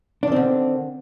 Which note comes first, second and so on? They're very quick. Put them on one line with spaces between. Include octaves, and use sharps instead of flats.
D4 D#3 C4 D3